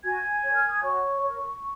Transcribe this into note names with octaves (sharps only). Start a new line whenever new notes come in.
F#4 G#5 G#6
A#4 C#5
F6
D#6
F#4 C#5 C#6
A#4 C#5